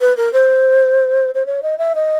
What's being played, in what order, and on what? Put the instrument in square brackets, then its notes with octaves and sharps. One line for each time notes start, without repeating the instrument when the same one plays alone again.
[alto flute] B4
A#4
C5
C5
C#5
D#5
E5
D#5